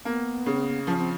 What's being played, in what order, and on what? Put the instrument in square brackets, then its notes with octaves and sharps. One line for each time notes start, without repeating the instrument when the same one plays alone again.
[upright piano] A#3 [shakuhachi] B3
[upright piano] C#3
[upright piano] F3 [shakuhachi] C#4
[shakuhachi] C4